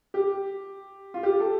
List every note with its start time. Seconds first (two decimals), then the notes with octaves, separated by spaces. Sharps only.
0.14 G4
1.14 F4
1.23 G4
1.40 A4